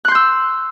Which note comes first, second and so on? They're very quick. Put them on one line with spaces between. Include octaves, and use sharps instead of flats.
F#6 C6 G6 E6